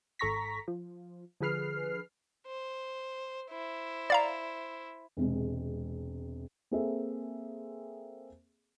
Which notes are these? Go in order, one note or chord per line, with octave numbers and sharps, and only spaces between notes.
G#1 A4 A#5 C#6 A#6 B6
F3
D3 F3 G#4 B4 F6 C7
C5
E4 C5
D5 F5 A#5
E1 C3 G#3
A#3 C4 G#4 A4 E5